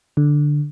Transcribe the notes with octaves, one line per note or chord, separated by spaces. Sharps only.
D3